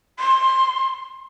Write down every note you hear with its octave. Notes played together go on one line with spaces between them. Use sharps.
C6